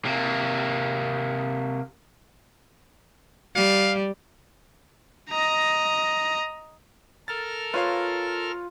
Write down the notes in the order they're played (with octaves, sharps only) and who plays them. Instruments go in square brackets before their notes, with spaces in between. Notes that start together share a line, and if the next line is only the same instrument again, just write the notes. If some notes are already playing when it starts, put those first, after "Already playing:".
[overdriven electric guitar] C3 A#3
[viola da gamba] G3 [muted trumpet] F5
[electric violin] D#5 A#5
[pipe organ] A4 A#4 F6 [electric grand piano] A6
[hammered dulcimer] F4 [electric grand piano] B4 C#5 F5